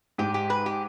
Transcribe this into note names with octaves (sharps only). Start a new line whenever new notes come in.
G#2 G4
G4
B4
G4